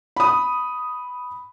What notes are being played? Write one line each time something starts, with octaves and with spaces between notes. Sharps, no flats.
B5 D#6